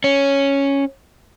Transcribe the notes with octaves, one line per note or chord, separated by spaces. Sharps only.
C#4